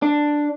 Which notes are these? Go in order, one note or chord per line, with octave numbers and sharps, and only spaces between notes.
D4